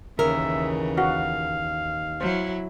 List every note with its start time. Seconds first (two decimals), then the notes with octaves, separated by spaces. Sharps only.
0.19 D#2 C#3 E3 A#4 E5
0.98 F#4 F5
2.21 F#3 E4 C5